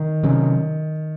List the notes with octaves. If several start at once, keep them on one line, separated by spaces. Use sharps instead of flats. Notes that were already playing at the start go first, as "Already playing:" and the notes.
Already playing: D#3
C3 F#3 C#4